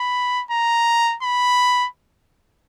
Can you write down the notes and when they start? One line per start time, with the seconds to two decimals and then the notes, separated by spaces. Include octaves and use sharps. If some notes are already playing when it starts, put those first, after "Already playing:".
Already playing: B5
0.51 A#5
1.22 B5